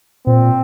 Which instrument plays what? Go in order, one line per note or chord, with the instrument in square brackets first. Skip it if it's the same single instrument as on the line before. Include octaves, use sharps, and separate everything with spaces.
[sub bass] A#2 [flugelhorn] C4